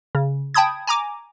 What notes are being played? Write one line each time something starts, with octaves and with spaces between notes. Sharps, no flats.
C#3
G5 A5 B5 D#6 G#6
G#5 A#5 D6